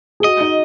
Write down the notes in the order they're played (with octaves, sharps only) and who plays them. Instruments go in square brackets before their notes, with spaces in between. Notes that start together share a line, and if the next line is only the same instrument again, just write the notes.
[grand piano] G#4
[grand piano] F#4 [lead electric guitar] D#5
[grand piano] D#4